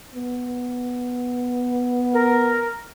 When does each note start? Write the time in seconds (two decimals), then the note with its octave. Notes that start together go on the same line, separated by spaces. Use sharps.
0.15 B3
2.13 A#4